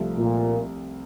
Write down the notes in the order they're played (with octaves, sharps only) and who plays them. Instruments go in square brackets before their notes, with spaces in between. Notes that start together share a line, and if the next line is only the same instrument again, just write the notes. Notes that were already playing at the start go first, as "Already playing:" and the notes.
Already playing: [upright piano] C2 C3 F3 A3
[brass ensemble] A#2